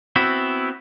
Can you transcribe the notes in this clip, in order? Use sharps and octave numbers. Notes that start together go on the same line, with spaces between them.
B3 C4 E4 F#4